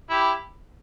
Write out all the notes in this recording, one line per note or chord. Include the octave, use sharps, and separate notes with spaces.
E4 G4